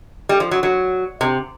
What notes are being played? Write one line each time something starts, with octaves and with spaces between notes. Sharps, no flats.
G3
F3
F#3
F#3
C3